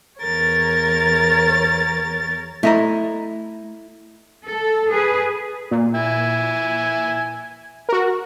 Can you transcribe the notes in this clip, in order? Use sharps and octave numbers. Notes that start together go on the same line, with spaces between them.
E2 A#4 C#5 A6
A3 E4 D#5 A#5
A4
G#4 B4
A#2
E4 G#5
F#4 A#4